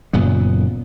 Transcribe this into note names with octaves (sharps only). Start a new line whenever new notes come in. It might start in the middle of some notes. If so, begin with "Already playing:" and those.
F#1 F#2 A#2 B3